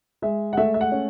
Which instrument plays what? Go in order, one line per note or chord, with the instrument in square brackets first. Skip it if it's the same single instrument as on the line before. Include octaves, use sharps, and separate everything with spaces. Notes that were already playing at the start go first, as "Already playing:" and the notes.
[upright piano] G#3 E5
F#5
A3 E5
E5
F#5
C#4